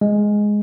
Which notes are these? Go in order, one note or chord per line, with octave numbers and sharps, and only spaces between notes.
G#3